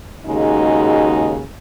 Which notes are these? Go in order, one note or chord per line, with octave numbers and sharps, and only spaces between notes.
D#2 C#3 G#3 D#4 F#4